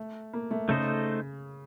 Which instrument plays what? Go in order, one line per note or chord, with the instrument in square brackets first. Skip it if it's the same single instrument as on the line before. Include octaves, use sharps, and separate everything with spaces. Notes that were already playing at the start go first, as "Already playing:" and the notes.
Already playing: [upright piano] A3
A#3
A3
[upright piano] C#3 [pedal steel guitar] A3 D#4 A4 C5 D#5